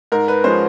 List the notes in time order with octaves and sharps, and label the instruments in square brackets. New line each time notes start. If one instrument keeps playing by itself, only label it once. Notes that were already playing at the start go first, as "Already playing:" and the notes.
[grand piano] G#2 A#4
B4
F3 G#3 C#4 C5